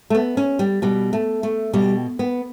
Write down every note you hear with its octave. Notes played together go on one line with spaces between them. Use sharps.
A3
B3
C#4
G3
B2 G3
A3
A3
B2 G3
B3